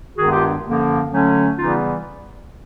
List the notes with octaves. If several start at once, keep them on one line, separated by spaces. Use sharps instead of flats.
G2 D#3 G#3 B3 D4 F#4 G#4
F4 G4
F#2 D3 F3 A#3
D3 F#3 A3 C#4
C#3 E3 G3 B3 D#4 F4